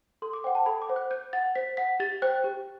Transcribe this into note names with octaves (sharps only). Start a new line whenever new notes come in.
A4 C6
D6
C5 F#5 G5
A5
A4 B5
D6
C5 F#5
F#6
C5 G6
F#5 A6
C5 B6
F#5 B6
G4 A6
C5 G5 F#6
G4